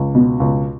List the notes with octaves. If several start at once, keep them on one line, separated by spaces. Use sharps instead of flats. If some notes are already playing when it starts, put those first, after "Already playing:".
Already playing: C#2
B2
C#2